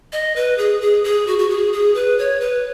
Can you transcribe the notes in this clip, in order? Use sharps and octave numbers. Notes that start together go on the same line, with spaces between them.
D#5
B4
G#4
G#4
G#4
F#4
F#4
G#4
G#4
B4
C#5
B4